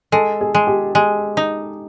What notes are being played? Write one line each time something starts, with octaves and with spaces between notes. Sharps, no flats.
G#3 A4
G#4
G#3
G4
G#3 G#4
D#4